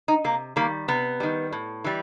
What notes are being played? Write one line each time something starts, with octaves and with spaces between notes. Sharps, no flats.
D#4
C3 A#3
D#3 G3 A#3
C3 B3
D#3 G3
A2
E3 G3